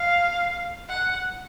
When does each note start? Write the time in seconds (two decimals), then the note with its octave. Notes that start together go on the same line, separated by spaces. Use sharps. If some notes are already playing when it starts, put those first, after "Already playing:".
Already playing: F5
0.89 F#5